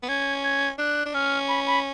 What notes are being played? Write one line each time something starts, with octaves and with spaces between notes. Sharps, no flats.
B3
C#4 G#6
G#6
D4 F#6
D4
C#4 F6
B5
B5